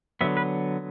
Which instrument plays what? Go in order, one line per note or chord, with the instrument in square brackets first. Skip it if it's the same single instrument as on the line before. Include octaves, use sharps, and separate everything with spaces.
[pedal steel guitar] D3 F#3 B3 E5
B4